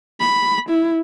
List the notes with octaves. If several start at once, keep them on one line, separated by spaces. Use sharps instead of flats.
B5
E4